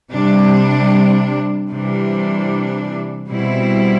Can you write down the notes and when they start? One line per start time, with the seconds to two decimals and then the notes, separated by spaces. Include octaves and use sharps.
0.11 C3 G3 D4
1.70 C3 E3 G3 D4
3.29 B2 G3 C4 E4